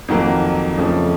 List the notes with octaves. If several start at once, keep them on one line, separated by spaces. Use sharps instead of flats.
F2 D#3 F#3 A#3
F2 C#3 F3 A3 C#4